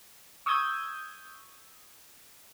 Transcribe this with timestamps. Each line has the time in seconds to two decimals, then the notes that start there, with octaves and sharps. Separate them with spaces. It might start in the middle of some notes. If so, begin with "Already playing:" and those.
0.46 C#6 D#6 E6 G6 G#6